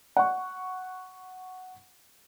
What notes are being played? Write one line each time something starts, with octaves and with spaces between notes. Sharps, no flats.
F#5 C#6